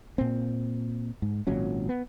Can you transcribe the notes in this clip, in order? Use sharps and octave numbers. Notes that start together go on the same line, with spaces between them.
A#2 C4
G#2
G#1 A#2 F#3 C#4
B3